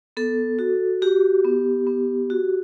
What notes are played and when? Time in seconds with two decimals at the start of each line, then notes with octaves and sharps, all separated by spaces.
0.17 B3 A4
0.59 F#4
1.02 F#4 G4
1.44 B3
1.87 B3
2.30 F#4